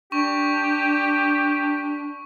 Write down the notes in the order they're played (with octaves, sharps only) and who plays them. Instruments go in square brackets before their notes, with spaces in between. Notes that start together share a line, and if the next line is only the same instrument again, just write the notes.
[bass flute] D4 [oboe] G4 [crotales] C#6